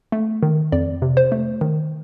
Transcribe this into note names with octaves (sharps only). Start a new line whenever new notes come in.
A3
D#3
F2 D5
C3
C5
A3
D#3